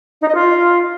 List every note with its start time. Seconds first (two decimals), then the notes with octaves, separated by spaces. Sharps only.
0.21 D#4
0.28 D#5
0.35 F4